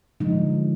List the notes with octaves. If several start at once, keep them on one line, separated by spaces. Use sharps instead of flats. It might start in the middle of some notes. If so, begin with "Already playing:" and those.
D3 F3 G#3 D#4